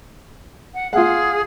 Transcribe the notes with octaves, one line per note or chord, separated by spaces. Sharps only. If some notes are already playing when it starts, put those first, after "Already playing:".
F#5
F4 G#4 F5 F#5